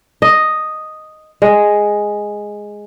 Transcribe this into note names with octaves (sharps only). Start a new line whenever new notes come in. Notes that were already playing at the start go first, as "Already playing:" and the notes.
D#5
G#3